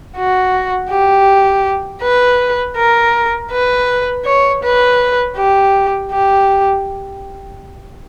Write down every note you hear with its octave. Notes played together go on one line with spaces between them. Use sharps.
F#4
G4
B4
A#4
B4
C#5
B4
G4
G4